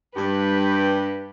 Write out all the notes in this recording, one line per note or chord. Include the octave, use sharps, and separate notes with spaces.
G2 G3 G4 B4